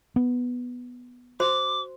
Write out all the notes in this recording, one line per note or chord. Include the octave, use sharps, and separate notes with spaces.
B3
F#4 C5 C6 D6